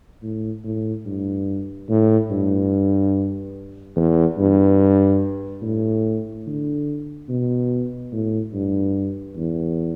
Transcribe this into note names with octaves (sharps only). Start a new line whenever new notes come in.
A2
A2
G2
A2
G2
E2
G2
A2
D3
B2
A2
G2
E2